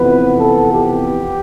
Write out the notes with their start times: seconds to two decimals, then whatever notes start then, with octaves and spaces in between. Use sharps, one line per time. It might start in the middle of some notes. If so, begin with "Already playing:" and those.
Already playing: F2 C3 E3 B3 B4
0.39 A4
0.72 G4